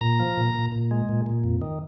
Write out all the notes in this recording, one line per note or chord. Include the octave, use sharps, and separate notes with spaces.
A#2 A#5
F3
A#2
A#2
A#2
G#3
A#2
A#2
F2
D#3